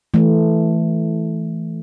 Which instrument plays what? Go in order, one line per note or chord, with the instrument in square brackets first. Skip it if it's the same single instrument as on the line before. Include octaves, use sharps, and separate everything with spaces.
[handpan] E3 A3